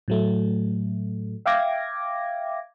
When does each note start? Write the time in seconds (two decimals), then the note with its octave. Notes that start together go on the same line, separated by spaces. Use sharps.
0.08 A2 F#3 A3
1.46 E5 F5 G5 D6 G#6 A#6